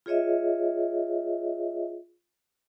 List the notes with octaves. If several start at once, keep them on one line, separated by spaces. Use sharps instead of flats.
F4 G#4 C#5 D#5 E5